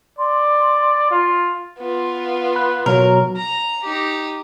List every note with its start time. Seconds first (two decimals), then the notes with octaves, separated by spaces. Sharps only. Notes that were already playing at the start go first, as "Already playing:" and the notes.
0.19 D5 C6
1.11 F4
1.78 B3 F4
2.56 B5 F#6
2.86 B2 F#3 A#4
3.37 A#5
3.84 D#4 G4